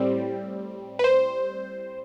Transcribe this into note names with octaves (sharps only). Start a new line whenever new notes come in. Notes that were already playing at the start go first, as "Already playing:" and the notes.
Already playing: A2 G3 C4
B4
C5